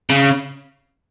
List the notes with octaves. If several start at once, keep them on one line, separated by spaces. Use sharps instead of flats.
C#3